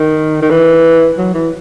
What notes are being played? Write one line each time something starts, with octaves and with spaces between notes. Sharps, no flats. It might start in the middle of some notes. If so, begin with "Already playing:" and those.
Already playing: D#3
D#3
E3
F#3
E3